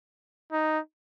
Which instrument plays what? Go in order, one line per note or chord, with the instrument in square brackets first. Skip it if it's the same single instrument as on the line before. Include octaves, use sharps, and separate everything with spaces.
[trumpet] D#4